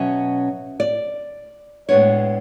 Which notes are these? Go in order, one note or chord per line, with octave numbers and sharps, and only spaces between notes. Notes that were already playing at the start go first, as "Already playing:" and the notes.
Already playing: B2 F#3 C#4 E5
D5
A2 G#3 B3 D4 C#5